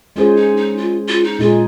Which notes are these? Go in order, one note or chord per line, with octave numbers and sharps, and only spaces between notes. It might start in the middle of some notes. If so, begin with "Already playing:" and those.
G#3 C#4 F4 G#4 C5
D#4
D#4
F4
F4
D#4
A#2 G#3 D#4 F4 G#4